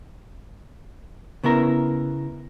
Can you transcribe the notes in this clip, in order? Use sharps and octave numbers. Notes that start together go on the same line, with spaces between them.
C#3 B3 E4 A#4